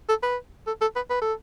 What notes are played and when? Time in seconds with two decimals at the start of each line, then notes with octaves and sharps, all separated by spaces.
0.09 A4
0.23 B4
0.67 A4
0.81 A4
0.96 B4
1.10 B4
1.22 A4